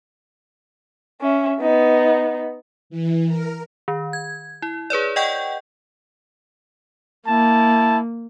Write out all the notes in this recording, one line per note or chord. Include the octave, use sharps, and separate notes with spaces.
C#4 E5
B3 D#4
E3
A#4
D#3
G#6
E4
G#4 B4 C#5 D5
D#5 F#5 G5 C#6 G6
A#3 E4 A5